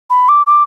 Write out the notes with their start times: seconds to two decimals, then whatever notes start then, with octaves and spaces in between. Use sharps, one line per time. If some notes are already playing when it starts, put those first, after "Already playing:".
0.10 B5
0.29 D6
0.47 D6